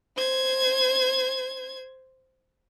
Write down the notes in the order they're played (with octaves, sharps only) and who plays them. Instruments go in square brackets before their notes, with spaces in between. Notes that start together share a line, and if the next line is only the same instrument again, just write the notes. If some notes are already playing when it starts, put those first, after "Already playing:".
[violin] C5 G#6